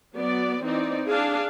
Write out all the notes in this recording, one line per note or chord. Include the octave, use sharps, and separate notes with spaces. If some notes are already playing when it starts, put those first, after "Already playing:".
F#3 B3 D5
E3 C4 D#4 D5
D4 G#4 F5